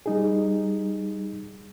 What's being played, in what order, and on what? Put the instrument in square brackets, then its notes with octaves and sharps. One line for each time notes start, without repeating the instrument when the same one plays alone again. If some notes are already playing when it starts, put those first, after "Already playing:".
[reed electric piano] G3 D#4 G#4